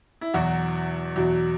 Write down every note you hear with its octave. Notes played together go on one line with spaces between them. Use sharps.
E4
E2 B2 F#3 F#4
E2 B2 F#3